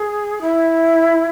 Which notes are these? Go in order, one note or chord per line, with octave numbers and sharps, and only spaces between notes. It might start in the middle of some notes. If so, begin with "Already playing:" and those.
Already playing: G#4
E4